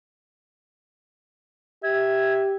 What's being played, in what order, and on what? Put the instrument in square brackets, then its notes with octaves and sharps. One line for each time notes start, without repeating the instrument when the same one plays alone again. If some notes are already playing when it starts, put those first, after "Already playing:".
[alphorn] G4 [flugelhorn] E5 [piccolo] G#6